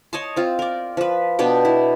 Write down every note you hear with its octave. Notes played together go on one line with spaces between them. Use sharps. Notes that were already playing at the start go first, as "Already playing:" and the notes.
C#5 D#5 A5 C6
C4 F4
A#4 D5
F3 B4
B2 B3 D4 G5
E4